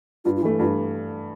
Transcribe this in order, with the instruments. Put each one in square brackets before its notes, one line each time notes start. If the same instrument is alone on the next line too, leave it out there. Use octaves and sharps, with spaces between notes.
[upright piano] G2 [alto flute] F4
[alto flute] F4
[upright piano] E3 A3 [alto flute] E4
[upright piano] G2 [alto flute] F4